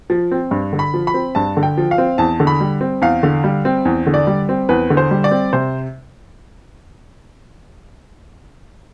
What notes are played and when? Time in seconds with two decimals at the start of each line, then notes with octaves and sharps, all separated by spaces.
0.10 F3
0.32 C4
0.51 G2
0.73 D3
0.79 B5
0.94 F3
1.07 B5
1.14 C4
1.35 G2 A5
1.57 D3
1.63 G5
1.78 F3
1.91 F5
1.98 C4
2.18 E2 A5
2.40 D3
2.47 B5
2.60 G3
2.81 C4
3.02 E2 F5
3.23 D3
3.44 G3
3.65 C4
3.85 E2
4.07 D3
4.14 D5
4.27 G3
4.49 C4
4.69 E2 B4
4.90 D3
4.97 C5
5.11 G3
5.24 D5
5.31 C4
5.53 C3 C5